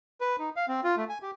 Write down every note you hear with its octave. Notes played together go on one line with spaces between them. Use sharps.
B4
D#4
F5
C4
F4
A3
G#5
G4